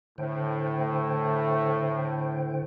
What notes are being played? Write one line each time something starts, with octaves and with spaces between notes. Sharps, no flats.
A2 D3 C5 G5
A3